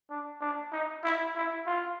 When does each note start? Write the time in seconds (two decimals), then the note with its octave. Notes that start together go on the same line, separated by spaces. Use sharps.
0.11 D4
0.41 D4
0.73 D#4
1.04 E4
1.36 E4
1.67 F4